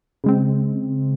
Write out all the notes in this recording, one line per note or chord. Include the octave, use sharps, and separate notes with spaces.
C#3 G#3 C4